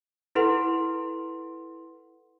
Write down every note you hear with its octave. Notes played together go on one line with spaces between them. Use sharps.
E4 A4 B4 F#5 C6